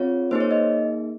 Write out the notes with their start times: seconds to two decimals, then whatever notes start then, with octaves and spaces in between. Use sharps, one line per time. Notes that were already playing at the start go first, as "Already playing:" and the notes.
Already playing: C4 F4 G#4 C#5
0.31 A#3 D#4 G#4 C5
0.40 C#5
0.51 D#5